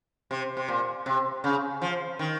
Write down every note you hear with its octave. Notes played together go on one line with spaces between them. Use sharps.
C3
C3
A#2
C3
C#3
F3
D#3